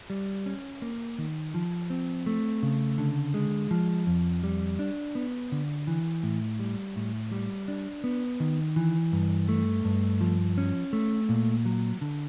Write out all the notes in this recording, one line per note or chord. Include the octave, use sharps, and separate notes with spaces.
G3
C#4
A#3
D#3
F3
C4
A3
C#3
D3
G#3
F3
F2
G3
D4
B3
D3
E3
A2
G3
A2
G3
D4
B3
D#3
E3
G2
A3
G2
F3
C#4
A3
A#2
F#3
D3